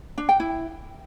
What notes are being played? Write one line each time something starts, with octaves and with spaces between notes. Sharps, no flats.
D4
G5
E4